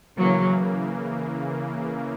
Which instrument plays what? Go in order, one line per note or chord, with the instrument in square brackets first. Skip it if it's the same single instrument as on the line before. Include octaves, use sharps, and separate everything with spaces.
[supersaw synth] C#3 E3 A#3 [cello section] F#3